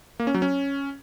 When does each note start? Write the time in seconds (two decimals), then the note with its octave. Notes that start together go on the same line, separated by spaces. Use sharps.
0.20 A#3
0.27 C#4
0.34 F#3
0.42 C#4